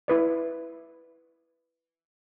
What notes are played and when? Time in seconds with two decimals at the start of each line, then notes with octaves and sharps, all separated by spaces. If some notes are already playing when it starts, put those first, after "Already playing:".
0.08 E4 B4 D5